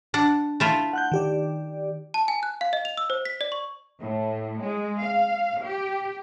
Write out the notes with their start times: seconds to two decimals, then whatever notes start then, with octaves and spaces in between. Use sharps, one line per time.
0.14 D4 F#5
0.60 A3 E4 F4
0.93 F#5 F#6 G6
1.12 D#3 G4 D5
2.14 A5
2.28 G#5
2.43 F#6
2.61 F5
2.73 D#5
2.85 F7
2.97 E6
3.10 C5
3.25 B6
3.41 D5
3.52 C#6
3.99 A2
4.61 G#3
4.99 F5
5.64 G4